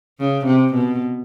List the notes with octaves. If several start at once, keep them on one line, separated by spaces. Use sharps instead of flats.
C#3
C3
B2